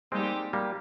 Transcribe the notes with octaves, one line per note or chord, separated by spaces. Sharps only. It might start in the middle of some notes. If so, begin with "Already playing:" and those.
G3 G#3 A#3 C4 D#4 G4
G3 A#3